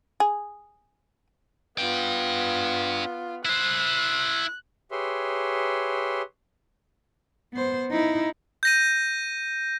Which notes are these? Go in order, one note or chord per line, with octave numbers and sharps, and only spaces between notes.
G#4
B3 D4 F4 G5
E4 C5 F#6
G4 G#4 B4 C#5 E5 C6
B3 C5
D#4 E4
G6 A#6 D#7